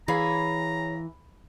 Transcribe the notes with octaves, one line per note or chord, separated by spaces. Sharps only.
E3 G#4 C#5 F5 A#5 B5